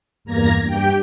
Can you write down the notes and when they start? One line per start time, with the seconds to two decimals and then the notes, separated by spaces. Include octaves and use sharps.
0.24 E2 G2 A#3 A#5 G#6 A#6
0.66 G2 G4 G5